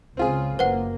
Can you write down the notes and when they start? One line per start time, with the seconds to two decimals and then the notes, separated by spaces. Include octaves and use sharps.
0.17 C#2 C#3 C4 F4 G#4
0.59 F#1 A#3 B4 C5 F#5